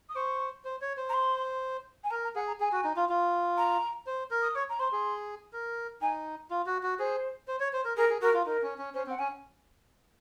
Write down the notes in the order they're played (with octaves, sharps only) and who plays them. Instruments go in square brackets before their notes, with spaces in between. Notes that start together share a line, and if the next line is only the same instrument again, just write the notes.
[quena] D#6
[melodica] C5 [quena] C#6
[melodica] C5
C#5
C5
[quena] A#5
C6
G#5
[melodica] A#4 [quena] A#5
[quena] A#5
[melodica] G#4 [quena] F#5
[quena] A#5
[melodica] G#4 [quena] G#5
[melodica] F#4
D#4
F4
F4
[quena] A#5
[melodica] C5
A#4
[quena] D#6
[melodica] C#5 [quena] C#6
[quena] A#5
[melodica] C5 [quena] C6
[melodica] G#4
A#4
[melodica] D#4 [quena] G#5
[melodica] F4
F#4
F#4
[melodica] G#4 [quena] C5
[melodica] C5
C#5
C5
A#4
[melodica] G#4 [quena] A#4
[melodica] G#4
[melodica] F#4 [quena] A#4
[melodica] F4
[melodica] D#4 [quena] A#4
[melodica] C#4
C#4
[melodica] C#4 [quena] C5
[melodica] C4 [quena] F#5
[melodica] C#4 [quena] G#5